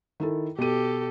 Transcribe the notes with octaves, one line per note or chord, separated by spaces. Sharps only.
D#3 E4 A4
B2 G4 A4 D#7